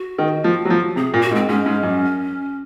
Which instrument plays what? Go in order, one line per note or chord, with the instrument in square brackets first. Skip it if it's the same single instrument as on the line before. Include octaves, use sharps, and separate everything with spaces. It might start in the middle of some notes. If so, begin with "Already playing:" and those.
Already playing: [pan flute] F#4
[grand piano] D#3
F3
F#3
F3
[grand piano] C3 [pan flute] G#4
[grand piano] A#2
[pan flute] F#4
[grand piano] G#2
[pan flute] C4
[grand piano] G#2 [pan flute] C#4
[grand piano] G#2
F#2